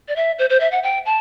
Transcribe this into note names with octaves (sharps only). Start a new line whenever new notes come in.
D5
E5
C5
C5
E5
F#5
G5
A5